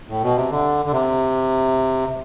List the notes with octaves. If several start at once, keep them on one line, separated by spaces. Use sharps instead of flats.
A2
B2
C3
D3
D3
C3